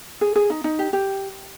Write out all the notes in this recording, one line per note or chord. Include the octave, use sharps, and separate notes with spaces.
G#4
G#4
D#4
D#4
G4
G4